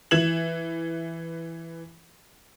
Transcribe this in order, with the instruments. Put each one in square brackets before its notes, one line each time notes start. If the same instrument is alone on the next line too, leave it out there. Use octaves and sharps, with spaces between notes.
[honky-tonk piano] E3 G#6 E7 F#7